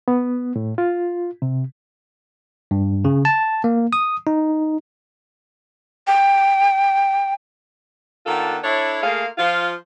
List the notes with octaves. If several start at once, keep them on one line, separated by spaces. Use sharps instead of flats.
B3
A2
F4
C3
G2
C#3
A5
A#3
D#6
D#4
G5
D#3 B3 D4 F4 A4
D4 E4 A4 C#5
A3 A#3 F4 G#4 F5
F3 F4